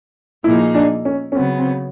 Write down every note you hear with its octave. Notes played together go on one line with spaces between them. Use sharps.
A#2 F3 A#3 D#4 E4 G#4
D4
C#4
C#4
C#3 F#3 B3 C4
C4